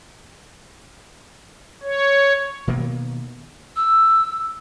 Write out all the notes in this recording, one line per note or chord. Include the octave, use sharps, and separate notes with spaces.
C#5
B2 D#3 A#3 B3
E6